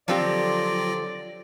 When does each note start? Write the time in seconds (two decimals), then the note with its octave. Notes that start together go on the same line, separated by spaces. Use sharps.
0.08 D3 F3 F#3 C4 F4 G4 D5 A#6